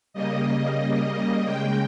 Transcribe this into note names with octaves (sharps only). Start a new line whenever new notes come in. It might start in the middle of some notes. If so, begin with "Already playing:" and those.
C#3 G3 A#3 D#5
C#3 G3 A#3
D#5
C#3 G#3 G5